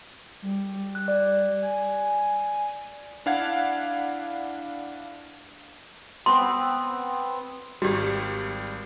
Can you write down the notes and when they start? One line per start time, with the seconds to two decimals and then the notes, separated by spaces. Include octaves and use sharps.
0.42 G3
0.95 F#6
1.08 D5
1.62 G#5
3.26 D4 E4 F5 F#5 G#6
6.26 B3 C4 C6
7.82 G#1 G3 F#4 G4